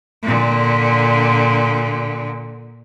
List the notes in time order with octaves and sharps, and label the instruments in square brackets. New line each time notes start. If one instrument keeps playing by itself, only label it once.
[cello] A#2 D3